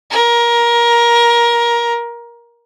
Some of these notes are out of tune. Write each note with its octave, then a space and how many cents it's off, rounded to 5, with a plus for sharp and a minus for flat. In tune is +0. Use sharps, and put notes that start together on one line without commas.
A#4 +20